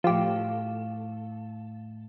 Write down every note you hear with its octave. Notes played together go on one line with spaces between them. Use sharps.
A2 F3 G4 A4 F5